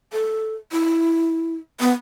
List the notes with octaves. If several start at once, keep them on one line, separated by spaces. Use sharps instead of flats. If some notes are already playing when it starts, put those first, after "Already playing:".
A4
E4
B3